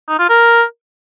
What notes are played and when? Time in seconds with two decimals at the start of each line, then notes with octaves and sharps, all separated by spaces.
0.08 D#4
0.19 F4
0.29 A#4